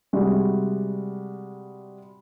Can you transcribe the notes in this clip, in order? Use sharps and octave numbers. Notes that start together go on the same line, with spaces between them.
C3 G3 G#3 F#4